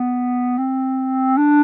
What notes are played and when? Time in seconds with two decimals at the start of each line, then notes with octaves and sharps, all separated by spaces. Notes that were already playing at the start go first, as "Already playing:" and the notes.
Already playing: B3
0.58 C4
1.37 D4